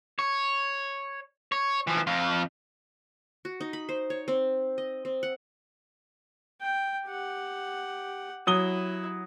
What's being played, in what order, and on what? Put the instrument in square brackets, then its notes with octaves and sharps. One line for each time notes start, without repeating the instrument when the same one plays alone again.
[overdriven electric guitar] C#5
C#5
E3 F3
F2 F4
[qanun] F#4
D#4
B5
C5
C#5
C4
D#5
C4
F#5
[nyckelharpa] G5
G4 F#5
[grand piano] F#3 D#6 G7 [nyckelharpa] E4